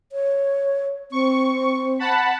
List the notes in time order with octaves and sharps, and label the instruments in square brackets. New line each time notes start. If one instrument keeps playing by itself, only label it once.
[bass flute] C#5
[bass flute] C4 [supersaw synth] C#6
[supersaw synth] F#5 A5 B5